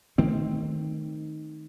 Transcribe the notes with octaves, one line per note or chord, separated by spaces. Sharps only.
D#3 A3 C4